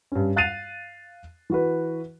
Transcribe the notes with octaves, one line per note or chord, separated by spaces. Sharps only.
G2 C#4
F5 F#6 A6 C7 D#7 F7
E3 F#4 B4